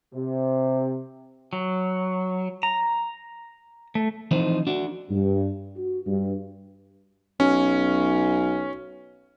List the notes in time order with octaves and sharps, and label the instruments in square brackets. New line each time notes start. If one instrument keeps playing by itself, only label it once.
[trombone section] C3
[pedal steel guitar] F#3
A#5
A3
[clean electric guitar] E3 F3 C4 D#4 C5
D4 F#4
[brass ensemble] G2
F#4
G2
[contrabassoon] B1 [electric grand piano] C#4